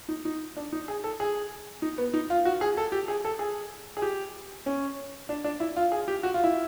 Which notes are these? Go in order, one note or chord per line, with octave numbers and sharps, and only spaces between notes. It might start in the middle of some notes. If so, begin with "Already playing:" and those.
D#4
D#4
D4
D#4
G#4
A4
G#4
D#4
B3
D#4
F4
F#4
G#4
A4
G4
G#4
A4
G#4
G#4
G4
C#4
D4
D4
E4
F4
G#4
G4
F#4
F4
E4